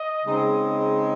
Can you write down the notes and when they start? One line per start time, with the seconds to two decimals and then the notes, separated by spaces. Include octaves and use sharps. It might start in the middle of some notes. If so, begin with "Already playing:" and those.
Already playing: D#5
0.25 C#3 G#3 C4 D#4